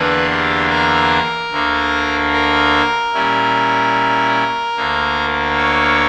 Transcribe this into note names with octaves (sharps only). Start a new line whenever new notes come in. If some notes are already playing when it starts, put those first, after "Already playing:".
Already playing: E2 D3 A#3 D4 B4
G4
A#4
D2 D3 A#3
A#4
A#2 G3 C#4 E4
D2 D3 A#3
C#5